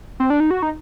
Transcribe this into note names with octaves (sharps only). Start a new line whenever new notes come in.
C4
D4
D#4
F#4
D#4